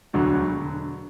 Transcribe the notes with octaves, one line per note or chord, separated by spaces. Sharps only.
E1 D2 D3 F#3